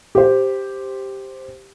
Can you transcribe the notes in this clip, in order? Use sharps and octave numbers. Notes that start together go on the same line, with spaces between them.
G4 C5